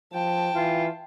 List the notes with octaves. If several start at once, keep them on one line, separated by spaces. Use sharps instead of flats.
F3 G5 A5
E3 F4